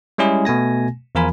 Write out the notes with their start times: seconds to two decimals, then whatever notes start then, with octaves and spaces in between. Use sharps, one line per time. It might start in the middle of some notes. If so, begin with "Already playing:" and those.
0.18 G3 G#3 C#4 E4 G#4
0.45 B2 A3 G#5 A#6
1.15 E2 F3 F4 A#4 G#5 B5